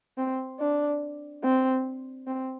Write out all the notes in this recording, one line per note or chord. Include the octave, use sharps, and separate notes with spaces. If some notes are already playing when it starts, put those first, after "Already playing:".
C4
D4
C4
C4